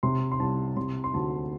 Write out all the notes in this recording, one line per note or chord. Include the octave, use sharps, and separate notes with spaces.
C3 C6
C6
C2 A5
C3 C6
C6
D2 A5